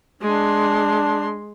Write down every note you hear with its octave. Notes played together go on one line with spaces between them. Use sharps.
G#3 D4 C6